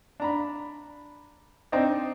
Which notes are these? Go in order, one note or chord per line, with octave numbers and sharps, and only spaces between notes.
D4 A#5 B5
C4 D4 D#4 D#5 G5